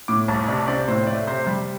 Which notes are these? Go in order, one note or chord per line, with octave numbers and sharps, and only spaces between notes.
A2 D6
C2 A5
C3 D5
C4 D5
A2 C5
A3 D5
C3 C5
G3